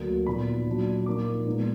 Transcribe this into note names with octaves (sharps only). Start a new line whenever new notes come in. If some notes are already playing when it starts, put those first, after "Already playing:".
Already playing: D2 D3 F#3 A#3
A#2 F3 B3 D#4 B5
A#2 F#3 D4
A#2 F3 A#3 D#4 D6
A#2 G#3 B3 D#4